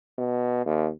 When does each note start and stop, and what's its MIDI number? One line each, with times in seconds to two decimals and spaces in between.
0.18 0.66 47
0.66 0.90 39